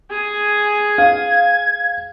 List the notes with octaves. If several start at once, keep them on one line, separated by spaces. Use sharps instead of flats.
G#4 G#5
F5 G#6